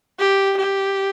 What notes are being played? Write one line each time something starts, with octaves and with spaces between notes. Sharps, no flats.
G4
G4